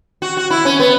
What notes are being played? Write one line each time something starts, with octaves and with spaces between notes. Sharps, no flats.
F#4
F#4
E4
C#4
B3